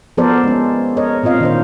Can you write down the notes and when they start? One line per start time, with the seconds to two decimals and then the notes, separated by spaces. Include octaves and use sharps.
0.17 F3 B3 A4 A#4 C5 D5
0.44 G#3 C#4
0.97 A#4 C#5 D#5
1.23 A#2 C4 F4 D#5 F5
1.41 D#3 D4 C5